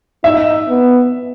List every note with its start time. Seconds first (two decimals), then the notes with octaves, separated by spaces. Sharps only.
0.24 D#4 E5
0.68 B3